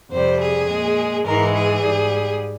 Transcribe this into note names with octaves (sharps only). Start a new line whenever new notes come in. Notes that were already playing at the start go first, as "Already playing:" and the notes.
F2 C3 G3 C5
G#4
A#2 G#3
G#2 E3 G#3 A#4
G#4
G#2 G3